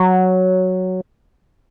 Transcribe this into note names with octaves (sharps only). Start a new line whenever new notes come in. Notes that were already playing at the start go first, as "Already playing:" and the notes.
Already playing: F#3